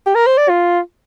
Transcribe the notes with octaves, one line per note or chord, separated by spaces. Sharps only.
G4
A#4
C5
D5
F4